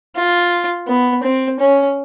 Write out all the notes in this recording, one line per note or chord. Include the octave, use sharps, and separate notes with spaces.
F4
B3
C4
C#4